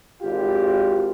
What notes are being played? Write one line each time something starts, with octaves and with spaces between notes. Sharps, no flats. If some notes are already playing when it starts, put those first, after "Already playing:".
G#1 F4 G4